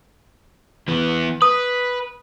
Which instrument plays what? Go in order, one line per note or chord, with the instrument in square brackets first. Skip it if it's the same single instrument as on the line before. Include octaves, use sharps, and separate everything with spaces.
[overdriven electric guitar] E3 B3
[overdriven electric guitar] B4 [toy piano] D#6